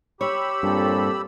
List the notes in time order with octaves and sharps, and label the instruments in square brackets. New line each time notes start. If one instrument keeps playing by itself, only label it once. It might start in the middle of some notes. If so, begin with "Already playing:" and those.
[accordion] G4 B5 E6 [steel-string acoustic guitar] C#5
[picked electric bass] G2 [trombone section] A#2 C4 A4